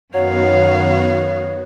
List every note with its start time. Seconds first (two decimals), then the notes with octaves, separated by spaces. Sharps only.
0.14 F#2 D#3 F#3 B3 F#4 C#5 F5